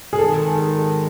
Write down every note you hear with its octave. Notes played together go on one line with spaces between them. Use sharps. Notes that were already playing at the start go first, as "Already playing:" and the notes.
G#4
G#1 G#2 D#3 G#3 A4